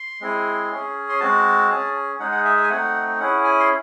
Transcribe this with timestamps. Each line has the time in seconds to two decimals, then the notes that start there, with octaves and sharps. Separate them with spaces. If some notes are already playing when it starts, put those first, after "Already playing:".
Already playing: C6
0.21 G#3 C4 E4 G#4
0.70 C#4 G#4
1.09 C6
1.20 G#3 C4 F#4 A5
1.70 C#4 G#4
2.20 G#3 D#4 G#4 F#5
2.32 F#5
2.45 E5
2.57 E5
2.63 G#5
2.69 A3 C4 D#4 F#5
3.20 C#4 E4 G#4 F#5
3.44 G#5
3.60 C6